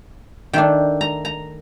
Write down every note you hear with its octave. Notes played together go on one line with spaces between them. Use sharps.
D#3 A3 D4 G5
A#5
A#5